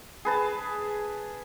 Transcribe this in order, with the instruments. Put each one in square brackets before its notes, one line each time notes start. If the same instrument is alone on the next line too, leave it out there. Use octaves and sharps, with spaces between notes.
[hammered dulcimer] G#4 B4 A5